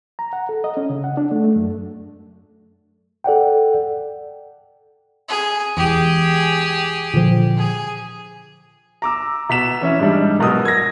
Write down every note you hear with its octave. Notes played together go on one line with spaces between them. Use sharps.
A#5
F#5
A4
D#5
C#4
C#3
F#5
D4
A3
A3
F#2
A4 D5 F#5 G5
G#4
E1 E2 G4 G#4
A#2 D3 F3
G#4
A#5 D6 E6
B2 B6 E7
E3 C#4 E5
G#2 G3 D4
B1 B2 A#4 D#6 E6
G#6 A#6